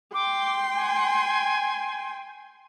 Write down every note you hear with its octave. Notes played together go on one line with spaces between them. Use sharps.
G5 C6 D6
G#5